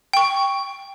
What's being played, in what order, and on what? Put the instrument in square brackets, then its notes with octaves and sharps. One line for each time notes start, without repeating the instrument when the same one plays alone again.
[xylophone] G5 C#6